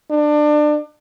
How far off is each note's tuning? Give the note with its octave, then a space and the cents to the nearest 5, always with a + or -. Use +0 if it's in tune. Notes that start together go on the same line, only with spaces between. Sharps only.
D4 +25